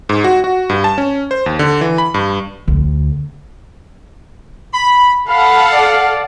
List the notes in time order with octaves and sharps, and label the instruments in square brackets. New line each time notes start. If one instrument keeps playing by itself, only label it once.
[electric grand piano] G#2
F#4
F#4
G2
A5
C#4
C5
D#2
D3
E3
B5
G2
[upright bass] D2
[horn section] B5
[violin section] A4 F#5 [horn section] F5 [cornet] B5
[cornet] D5